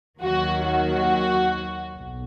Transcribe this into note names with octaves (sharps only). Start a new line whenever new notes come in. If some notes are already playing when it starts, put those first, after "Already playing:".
D#2 D#3 F#3 F#4
F#4
B1